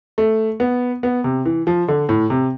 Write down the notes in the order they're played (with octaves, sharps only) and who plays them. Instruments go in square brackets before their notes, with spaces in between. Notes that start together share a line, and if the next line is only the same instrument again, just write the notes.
[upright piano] A3
B3
B3
C3
E3
F3
D3
A2
C3